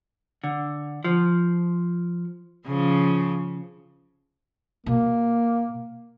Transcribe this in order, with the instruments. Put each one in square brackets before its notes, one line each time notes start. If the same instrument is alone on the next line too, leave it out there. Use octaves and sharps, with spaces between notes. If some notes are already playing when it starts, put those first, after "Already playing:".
[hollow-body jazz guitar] D3
F3
[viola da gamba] C#3 F3
[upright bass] B2 [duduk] A#3